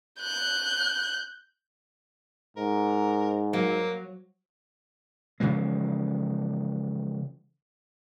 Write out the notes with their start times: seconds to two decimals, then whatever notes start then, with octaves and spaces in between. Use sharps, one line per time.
0.20 F#6 G6
2.57 G#2 A#4
3.53 F#3 A#3
5.40 C#3 E3 F3 G#3